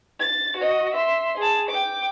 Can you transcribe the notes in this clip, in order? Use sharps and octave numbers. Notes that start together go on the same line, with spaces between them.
A6
F#4 D#5
E5 C6
G#4 A5
G5 D6